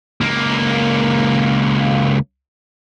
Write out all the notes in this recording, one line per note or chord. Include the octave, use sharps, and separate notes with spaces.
C#2 A#3